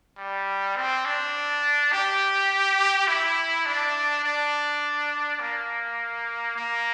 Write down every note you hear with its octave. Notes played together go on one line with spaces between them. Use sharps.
G3
C4
D4
G4
E4
D4
D4
A#3
A#3